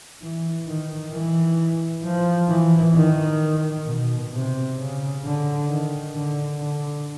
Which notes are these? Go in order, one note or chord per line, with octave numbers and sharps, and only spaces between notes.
E3
D#3
E3
F3
E3
D#3
B2
C3
C#3
D3
D#3
D3
D3